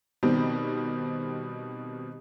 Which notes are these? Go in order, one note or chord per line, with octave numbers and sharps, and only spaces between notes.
B2 D#3 G3 C4